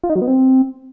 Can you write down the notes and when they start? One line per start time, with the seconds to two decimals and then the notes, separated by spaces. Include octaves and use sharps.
0.03 F4
0.09 D#4
0.16 F#3
0.22 B3
0.28 C4